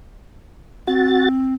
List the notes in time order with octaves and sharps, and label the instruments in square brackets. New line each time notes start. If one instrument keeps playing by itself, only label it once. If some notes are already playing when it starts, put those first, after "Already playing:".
[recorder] C4 [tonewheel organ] F#4 A6